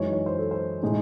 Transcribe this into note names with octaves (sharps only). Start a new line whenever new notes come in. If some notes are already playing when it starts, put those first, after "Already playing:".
Already playing: F#2 E3 G#3 D#4 C#5
C#5
C5
A4
C5
A2 G#3 D#4